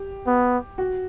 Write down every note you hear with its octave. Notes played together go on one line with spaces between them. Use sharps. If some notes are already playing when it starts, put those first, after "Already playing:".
Already playing: G4
B3
F#4